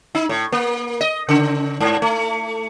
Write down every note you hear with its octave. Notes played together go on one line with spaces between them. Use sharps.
D#4
A2
A#3
D#5
C#3
G#2
A3